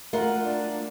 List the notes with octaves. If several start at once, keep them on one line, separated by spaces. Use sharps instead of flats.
A3 F4 A#4 F#5
D4